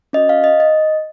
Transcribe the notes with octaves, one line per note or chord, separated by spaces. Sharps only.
C#4 F#4 D#5
F5
D#5
D#5